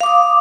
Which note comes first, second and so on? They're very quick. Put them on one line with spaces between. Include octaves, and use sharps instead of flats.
F5 D6 D#6